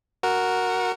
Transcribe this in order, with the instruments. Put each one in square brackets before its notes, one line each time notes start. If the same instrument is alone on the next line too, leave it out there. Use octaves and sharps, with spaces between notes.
[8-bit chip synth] F#4 A#4 F#5